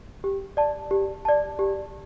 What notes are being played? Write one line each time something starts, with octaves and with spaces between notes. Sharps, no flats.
G4
D5 A5
G4
D5 A5
G4